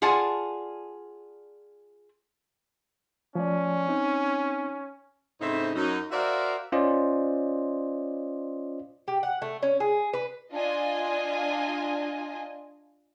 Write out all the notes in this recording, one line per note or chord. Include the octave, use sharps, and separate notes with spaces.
F4 G#4 D5 F#5 G#5 A5
F3 A3 C#4 D5
C4 D#4
A2 C#3 C4 D#4 C5 E5
F#2 D#4
F#4 A#4 C5 D5 E5 F5
C#4 F4 C5 D5 D#5
G4
F#5
A3
C#4
G#4
B4
D4 F4 D#5 G#5